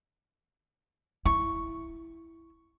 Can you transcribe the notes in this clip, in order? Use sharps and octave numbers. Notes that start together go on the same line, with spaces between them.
E4 C#6